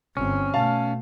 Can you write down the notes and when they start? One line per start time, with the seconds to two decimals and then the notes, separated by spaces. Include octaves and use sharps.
0.17 G1 C4 C#4
0.54 B2 A3 F5 A5